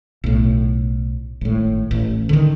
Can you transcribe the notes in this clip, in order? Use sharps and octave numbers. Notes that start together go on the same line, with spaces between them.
B1 A2
G#1 A2
A1
D3 D#3